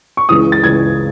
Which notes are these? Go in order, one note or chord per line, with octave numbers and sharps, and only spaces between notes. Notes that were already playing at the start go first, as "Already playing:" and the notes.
C#6
C#2 C#3 E3 D#6
A6
C#2 C#3 E3 G#6